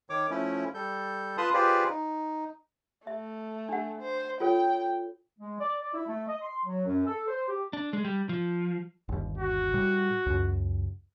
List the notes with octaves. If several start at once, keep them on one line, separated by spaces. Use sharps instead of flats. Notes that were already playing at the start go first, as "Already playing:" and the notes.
D#3 C#5 D6
F3 A3 C#4 E4
G3 A4 G6
F4 B4 A5 B5 C6 D#6
F4 G4 G#4 B4 C5 D5
D#4
A3 E5
D4 F#5
C5
F4 A4 C#5 G5
G#3
D5
D5
E4
A3
D#5
C6
F#3
F#2
A4
C5
G4
D4
G#3
G3
F3
G1 D#2
F#4
A2 G3
C#2 F#2